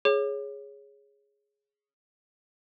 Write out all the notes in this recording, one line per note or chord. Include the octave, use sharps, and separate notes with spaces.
G#4 C#5